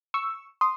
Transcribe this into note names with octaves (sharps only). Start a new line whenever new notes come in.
C#6 E6
C6 D#6